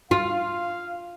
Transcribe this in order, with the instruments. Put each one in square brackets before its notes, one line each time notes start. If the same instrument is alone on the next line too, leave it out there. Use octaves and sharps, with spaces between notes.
[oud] F4 [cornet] F5